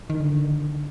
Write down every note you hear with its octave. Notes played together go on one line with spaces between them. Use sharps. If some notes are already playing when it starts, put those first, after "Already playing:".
D#3
D3